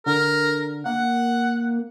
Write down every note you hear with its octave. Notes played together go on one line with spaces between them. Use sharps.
D3 A#4
A#3 F#5